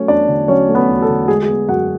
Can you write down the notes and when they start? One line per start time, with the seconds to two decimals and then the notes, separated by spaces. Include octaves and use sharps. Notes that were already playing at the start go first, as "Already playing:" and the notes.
Already playing: F#3 A3 C#4 C#5
0.08 E2 D4 D5
0.28 D3
0.48 F#3 C#4 C#5
0.69 A3
0.75 B3 B4
0.89 E2
1.02 A4
1.09 D3
1.28 G#3 G#4
1.43 G#4
1.48 B3
1.69 F#2 F#4 F#5